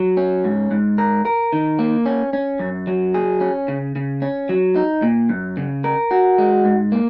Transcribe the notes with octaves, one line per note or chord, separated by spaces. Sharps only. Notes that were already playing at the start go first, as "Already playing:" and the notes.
Already playing: F#3
C#4
G#2
G#2
A#4
A#4
D#3
A#3
C#4
C#4
F#2
F#3
G#4
C#4
C#3
C#3
C#4
F#3
D#4
A#2
F#2
C#3
A#4
F#4
G#3
G#2
A#3